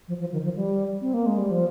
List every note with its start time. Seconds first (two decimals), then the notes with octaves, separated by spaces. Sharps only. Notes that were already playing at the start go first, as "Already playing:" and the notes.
0.08 F3
0.20 F3
0.32 D#3
0.44 F3
0.55 G3
1.01 C4
1.14 A#3
1.26 G#3
1.38 G3
1.51 F3